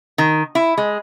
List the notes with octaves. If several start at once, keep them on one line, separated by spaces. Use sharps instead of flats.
D#3
E4
G#3